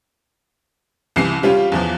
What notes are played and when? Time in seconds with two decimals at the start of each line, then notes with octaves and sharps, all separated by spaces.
1.16 C2 C#3 E3 C7
1.43 G3 C#4 F4 G4
1.72 E2 E3 F3